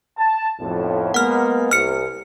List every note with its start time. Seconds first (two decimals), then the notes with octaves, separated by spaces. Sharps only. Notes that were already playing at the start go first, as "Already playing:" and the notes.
0.17 A5
0.59 B1 F2 A2
1.14 G#3 A#3 B3 F#5 F6
1.71 C2 F6 C#7